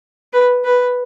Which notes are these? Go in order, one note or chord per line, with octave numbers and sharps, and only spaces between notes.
B4
B4